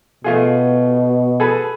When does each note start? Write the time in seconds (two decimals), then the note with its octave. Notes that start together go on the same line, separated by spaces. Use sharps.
0.24 B2 A3 F4 G#4
1.40 G#4 A4 B4